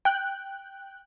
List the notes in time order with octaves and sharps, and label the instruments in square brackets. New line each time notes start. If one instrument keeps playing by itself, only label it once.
[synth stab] G5 F#6